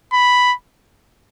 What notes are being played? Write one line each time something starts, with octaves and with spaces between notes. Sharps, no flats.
B5